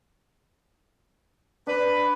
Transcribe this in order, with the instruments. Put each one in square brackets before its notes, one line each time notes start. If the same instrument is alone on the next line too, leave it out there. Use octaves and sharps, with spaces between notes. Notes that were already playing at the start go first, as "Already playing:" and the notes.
[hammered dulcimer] D4 [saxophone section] B4